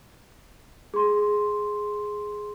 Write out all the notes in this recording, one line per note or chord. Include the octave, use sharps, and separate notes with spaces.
G#4 C6